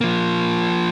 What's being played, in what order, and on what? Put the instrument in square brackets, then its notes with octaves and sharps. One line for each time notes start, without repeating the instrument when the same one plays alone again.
[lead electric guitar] F3 A#3